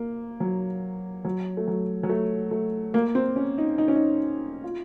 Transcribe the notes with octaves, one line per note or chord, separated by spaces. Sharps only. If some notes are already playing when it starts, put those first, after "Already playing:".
Already playing: A#3
F#3
F#3
A3
F#3
F#3
A3
A3
A#3
C4
C#4
D#4
D#4
C#4
D#4
F4